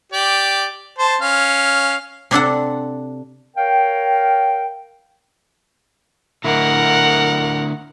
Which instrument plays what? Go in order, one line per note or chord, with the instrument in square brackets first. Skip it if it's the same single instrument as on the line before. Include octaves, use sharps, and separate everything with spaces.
[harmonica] G4 D5
C5 A5
C#4 F5
[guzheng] C3 D4 A4 F#5
[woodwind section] A#4 C#5 F5 G5
[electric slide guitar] D3 A3 E4 [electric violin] A#4 F#5